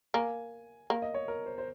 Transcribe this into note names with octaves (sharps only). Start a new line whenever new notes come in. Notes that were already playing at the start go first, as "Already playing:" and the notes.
A#3 G#5
A#3
D#5
C#5
A#4
C5
C5